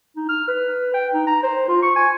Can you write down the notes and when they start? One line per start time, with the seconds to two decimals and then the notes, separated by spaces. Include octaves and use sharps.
0.16 D#4
0.29 F6
0.48 B4
0.94 G5
1.14 D#4
1.27 A#5
1.43 C5
1.68 F4
1.82 C#6
1.96 G#5